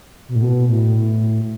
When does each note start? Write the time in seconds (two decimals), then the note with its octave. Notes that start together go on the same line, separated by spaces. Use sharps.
0.28 B2
0.35 A2
0.42 B2
0.69 A2